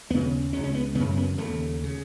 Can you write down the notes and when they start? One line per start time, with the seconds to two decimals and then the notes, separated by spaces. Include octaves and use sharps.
0.10 D#2 C#3 B3
0.53 C#2 C#3 C#4
0.64 C#4
0.75 B3
0.95 F#2 C#3 B3
1.17 B3
1.38 D#2 C#3 A3
1.84 C#3